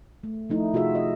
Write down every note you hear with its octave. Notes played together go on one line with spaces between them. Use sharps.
A3
F3 A3 D#4 E4
C3 F4 F#4 G#4 E5
D#5